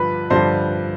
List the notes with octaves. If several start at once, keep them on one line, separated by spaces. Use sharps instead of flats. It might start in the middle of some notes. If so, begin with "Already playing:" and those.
Already playing: G2 D3 F3 B4 B5
G2 D3 F3 C5 C6